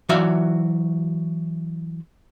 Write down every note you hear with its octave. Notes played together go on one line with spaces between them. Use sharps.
E3 F#3 F#4 D5 E5 F5